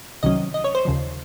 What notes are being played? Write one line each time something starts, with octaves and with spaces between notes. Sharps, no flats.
C2 C3 D#3 F#3 C#4 D#5
D#5
C#5
C5
D#2 C#3 F3